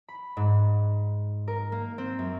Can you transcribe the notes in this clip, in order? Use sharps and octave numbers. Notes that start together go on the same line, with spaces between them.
B5
G#2
A#4
A#3
C4
F#2